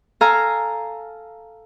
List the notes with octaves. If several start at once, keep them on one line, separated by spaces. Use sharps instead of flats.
A4 F5 G#5 A#5